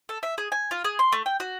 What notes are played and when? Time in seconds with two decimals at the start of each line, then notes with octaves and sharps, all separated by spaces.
0.09 A4
0.23 E5
0.38 G#4
0.52 G#5
0.71 F4
0.84 G#4
0.99 C6
1.12 A3
1.26 G5
1.40 F#4